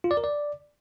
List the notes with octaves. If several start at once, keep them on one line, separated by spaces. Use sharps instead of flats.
F4
D5
A#4
D5